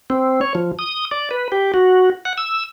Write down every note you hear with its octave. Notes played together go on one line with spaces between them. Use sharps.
C4
C#5
F3
D#6
D5
B4
G4
F#4
F#5
E6